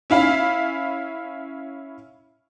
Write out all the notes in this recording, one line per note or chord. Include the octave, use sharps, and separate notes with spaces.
C#4 E4 F5 B5